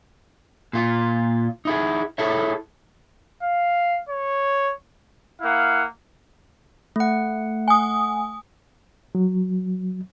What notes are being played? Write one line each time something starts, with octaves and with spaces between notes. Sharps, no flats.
A#2 F4
D#4 E4 G#4
E4 G#4 A4 C#5 E5
F5
C#5
A#3 E4 F5 F#5
A3 F#5
G#5 D#6
F#3